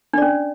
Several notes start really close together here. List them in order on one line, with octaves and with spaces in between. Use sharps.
D4 D5 C#4